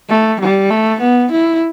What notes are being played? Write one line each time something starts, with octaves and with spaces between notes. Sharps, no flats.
A3
G3
A3
B3
E4